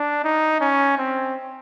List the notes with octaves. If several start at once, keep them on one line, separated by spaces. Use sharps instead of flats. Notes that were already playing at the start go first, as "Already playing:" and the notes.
Already playing: D4
D#4
C#4
C4